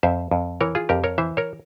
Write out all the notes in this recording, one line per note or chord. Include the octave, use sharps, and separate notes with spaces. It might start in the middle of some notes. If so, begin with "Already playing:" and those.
F2 C5 E5
F2
E3 A#4 C#5
F4 G#4
F2 G4 A#4
A#4 C#5
E3 C5 E5
A#4 C#5